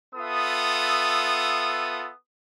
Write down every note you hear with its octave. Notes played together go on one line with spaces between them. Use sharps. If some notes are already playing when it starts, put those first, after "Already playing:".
B3 F4 A4 E5 D#6